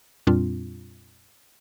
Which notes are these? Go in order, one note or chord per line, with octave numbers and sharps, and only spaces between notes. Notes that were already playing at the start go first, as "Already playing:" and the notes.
F2 A#2 G3 C4 D4 F4